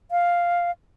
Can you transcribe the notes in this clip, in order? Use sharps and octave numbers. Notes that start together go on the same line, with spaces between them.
F5